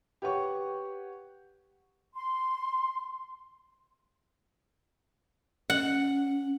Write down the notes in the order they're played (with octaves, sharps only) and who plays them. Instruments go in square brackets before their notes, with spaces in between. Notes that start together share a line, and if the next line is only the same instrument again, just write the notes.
[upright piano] G4 B4 C#5 F#5 C#6
[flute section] C6
[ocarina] C#4 [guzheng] F#5